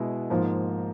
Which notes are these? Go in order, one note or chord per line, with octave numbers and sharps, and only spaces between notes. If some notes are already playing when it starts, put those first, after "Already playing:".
Already playing: B2 G#3 B3 E4
G#2 F3 A#3